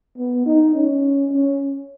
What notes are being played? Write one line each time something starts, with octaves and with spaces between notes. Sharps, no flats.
B3
D#4
C#4
C#4